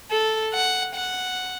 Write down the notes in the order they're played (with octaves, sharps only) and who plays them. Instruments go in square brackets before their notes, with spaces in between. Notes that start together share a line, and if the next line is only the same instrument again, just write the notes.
[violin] A4
F#5
F#5